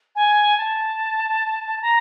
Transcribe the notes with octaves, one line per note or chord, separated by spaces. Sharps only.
G#5
A5
A#5